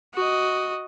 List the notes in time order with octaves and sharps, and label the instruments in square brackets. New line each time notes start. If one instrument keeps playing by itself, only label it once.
[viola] F#4 D#5